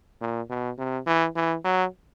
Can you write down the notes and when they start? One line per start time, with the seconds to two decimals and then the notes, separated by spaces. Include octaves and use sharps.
0.21 A#2
0.50 B2
0.78 C3
1.07 E3
1.36 E3
1.64 F#3